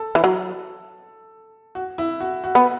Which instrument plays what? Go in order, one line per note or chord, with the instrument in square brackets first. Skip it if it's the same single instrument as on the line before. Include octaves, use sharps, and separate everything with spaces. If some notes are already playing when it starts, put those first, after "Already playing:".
Already playing: [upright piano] A4
[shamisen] E3
F#3
[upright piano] F#4
E4
F#4
F#4
[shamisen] B3